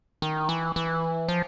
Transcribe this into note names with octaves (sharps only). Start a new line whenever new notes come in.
D#3
E3
E3
F3